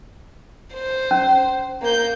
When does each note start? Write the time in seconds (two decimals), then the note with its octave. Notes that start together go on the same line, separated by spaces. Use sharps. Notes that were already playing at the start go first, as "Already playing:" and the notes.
0.74 C5
1.11 C#4
1.82 A#3 G6